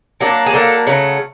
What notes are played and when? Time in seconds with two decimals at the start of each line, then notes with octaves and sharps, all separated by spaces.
0.21 F#3 A#3 D4
0.46 G#4
0.53 F#3 A#3 D4 A4
0.87 C#3 F#3 A3